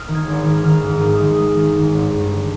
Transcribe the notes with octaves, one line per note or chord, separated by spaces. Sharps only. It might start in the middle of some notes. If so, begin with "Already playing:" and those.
Already playing: D#6 F6
D#3
G#6
G#1
D#3
D#3 F6
G#2
D#3 D#6
G#3
G#3
D#3
G#2
G#1
G2
D3